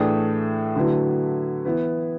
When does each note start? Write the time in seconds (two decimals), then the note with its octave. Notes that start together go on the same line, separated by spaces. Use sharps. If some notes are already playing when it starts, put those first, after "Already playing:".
Already playing: A2 E3 A3 D4 G#4
0.76 D3 F#3 A3 E4 B4
1.65 E3 B3 E4 B4